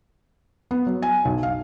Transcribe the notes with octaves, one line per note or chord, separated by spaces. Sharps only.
B3
F#3
G#5
B1
F5